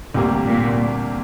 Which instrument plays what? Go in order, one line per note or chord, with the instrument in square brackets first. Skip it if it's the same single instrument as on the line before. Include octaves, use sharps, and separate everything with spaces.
[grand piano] D2 C3 G3 A#3
[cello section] A#2